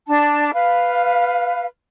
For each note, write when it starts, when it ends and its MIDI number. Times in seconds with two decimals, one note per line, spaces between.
0.08 0.51 62
0.08 0.51 81
0.54 1.66 71
0.54 1.66 77